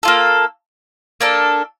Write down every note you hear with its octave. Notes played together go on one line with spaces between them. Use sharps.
A#3 F4 A4
A#3 D4 A4